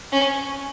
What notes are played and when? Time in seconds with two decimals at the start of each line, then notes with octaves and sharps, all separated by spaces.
0.12 C#4